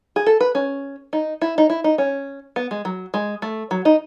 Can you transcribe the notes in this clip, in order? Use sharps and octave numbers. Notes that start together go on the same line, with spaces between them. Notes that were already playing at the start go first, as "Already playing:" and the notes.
G#4
A4
B4
C#4
D#4
E4
D#4
E4
D#4
C#4
B3
G#3
F#3
G#3
A3
F#3
D#4